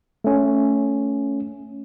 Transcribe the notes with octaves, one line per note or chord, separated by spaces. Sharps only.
A3 C#4